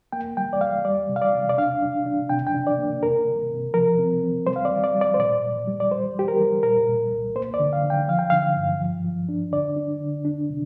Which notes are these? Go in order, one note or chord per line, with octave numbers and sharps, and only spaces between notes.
A#3 G5
G3 G5
D5
G3 F5
G3 D5
C3
F5
D5
C3
D5
D4 F5
D4
D4
C3 G5
G5
D4
D5
A#3
C3 A#4
C3
C3
F3 A#4
C4
C4
G3 C5
F5
D5
G3
D5
G3
D5
C5
A#2 D5
A#2
G3
D5
G3 C5
G3 G4
A#4
G3
A#2 A#4
A#2
C2
A#3 C5
D5
D3
F5
D3
G5
F3 F5
G5
D3 F5
G2
F3
F3
D4
D3 D5
D4
D3
D4
C3